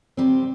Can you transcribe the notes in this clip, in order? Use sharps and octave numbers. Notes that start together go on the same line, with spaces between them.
C3 G3 C4 G4